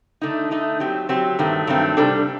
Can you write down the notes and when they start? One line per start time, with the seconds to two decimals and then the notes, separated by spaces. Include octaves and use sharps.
0.21 D3 A3 D#4
0.51 D3 A3 D#4
0.80 F#3 C4 G4
1.09 F#3 C4 G4
1.39 G2 D#3 F#3 A3 C4
1.67 G2 D#3 F#3 A3 C4
1.97 C3 G3 D4 A4